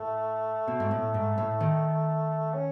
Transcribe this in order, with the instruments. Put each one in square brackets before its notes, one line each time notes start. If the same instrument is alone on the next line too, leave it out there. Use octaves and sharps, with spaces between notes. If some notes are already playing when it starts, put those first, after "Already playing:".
Already playing: [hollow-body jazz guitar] A2 [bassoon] A3
[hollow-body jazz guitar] B2
G#2
A2
G#2
A2
D#3
[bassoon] C#4